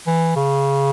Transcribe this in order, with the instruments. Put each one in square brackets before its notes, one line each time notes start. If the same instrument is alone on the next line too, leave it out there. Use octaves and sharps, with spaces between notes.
[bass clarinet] E3
C#3